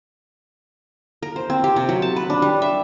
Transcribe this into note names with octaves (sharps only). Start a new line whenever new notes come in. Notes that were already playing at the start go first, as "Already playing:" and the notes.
A#4
C5
C4
G4
C3
F#3
A5
B4
D4
G3
E5